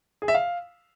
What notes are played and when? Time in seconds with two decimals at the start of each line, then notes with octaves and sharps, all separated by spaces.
0.22 G#4
0.28 E5
0.34 F5